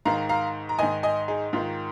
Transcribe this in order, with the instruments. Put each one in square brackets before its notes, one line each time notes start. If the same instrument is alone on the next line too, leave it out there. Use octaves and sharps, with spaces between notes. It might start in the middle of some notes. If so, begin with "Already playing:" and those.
[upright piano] G#2 D#3 F5 A#5
F5 A#5
A#5
G#2 D#3 D#5 G#5
D#5 G#5
D#4 G#4
G#2 D#3 F4